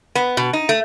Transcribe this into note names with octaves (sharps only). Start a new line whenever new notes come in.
B3
B2
D#4
A3